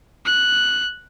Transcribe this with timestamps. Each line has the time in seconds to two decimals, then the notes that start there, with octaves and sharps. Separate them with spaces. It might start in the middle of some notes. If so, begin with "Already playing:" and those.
0.25 F#6